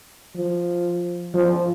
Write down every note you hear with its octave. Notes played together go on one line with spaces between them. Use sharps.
F3
F3